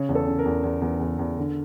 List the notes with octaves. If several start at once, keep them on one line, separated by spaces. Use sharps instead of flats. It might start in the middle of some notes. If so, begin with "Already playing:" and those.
Already playing: C#3 C#5
E2
A4
C#3
A#4
E2
E2
E2
E2
E2
D3